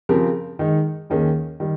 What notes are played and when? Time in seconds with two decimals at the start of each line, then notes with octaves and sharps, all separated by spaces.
0.09 C#3 F3 C4 G4 A#4
0.59 D#3 G#3 D#4
1.10 D#2 D#3 A#3 C#4 G#4
1.60 D#3 G3